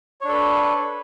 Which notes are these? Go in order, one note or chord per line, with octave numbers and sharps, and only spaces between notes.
D4 A4 B4 C#5